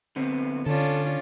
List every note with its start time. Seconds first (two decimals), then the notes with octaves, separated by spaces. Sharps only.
0.16 D3 B3 C4
0.66 D3 C#4 D4 F4 A4